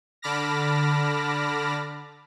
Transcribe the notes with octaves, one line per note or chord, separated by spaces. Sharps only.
D3 A5 B5 D6 F6 A#6